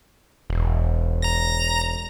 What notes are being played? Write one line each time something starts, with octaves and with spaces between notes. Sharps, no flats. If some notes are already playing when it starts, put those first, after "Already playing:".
E1
A#5 A#6